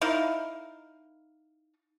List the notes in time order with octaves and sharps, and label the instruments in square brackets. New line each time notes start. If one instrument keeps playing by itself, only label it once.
[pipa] D#4 E4 A#4 F5